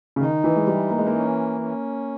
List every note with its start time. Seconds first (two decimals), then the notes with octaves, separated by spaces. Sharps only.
0.16 C#3
0.21 D#3 D#4
0.44 E3
0.56 G#3
0.67 E3 G3
0.91 A#3
0.99 G#3
1.07 A#3
1.14 C#4
1.61 C#4